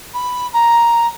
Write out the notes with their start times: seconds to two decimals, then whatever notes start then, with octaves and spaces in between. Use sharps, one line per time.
0.14 B5
0.53 A#5